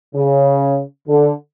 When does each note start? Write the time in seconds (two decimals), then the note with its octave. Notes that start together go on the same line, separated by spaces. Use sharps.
0.15 C#3
1.08 D3